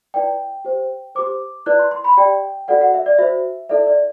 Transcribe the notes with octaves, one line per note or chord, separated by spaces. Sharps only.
E4 B4 D5 G5
G4 C5
G4 C5 D6
E4 B4 D5 F#6
C6
C6
B5
G4 D5 G5
F#4 A4 D5 F#5
F#5
E5
D5
F#4 C5 E5
E4 A4 D5 E5
D5